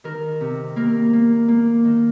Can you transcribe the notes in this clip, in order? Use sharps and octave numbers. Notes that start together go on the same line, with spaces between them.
D#3 A#4
C3
A#3 A#4
A#3
A#3
D#3